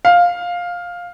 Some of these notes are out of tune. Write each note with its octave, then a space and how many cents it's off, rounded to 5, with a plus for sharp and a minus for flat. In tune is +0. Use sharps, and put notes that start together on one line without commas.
F5 +10